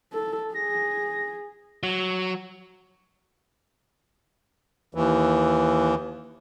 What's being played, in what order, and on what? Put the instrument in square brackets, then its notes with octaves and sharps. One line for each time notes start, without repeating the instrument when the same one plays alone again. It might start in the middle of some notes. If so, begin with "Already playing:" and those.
[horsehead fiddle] A4
[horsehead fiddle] G#4 [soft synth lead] A#6
[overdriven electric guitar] F#3
[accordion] D#2 E3